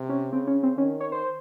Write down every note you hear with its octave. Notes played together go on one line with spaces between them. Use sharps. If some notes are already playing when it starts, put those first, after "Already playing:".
Already playing: C3
C#4
C#3 C4
C#4
C4
D#3 C#4
C#5
C5